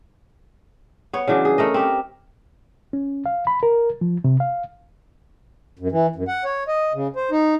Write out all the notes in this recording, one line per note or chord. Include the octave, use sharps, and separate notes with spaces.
B3 C#5
C#3 E3 F#3 D4
G#4
A3 A#4 D#5
C4 G4 A#4
C#4
F5
B5
A#4
F3
C3
F5
F#2
E3
F#2
F#5
C#5
D#5
C#3
C5
D#4